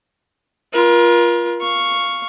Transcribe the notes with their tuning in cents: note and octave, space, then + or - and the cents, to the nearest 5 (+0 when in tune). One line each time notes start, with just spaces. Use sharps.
F4 -5 A#4 +35
F5 +0 C#6 +0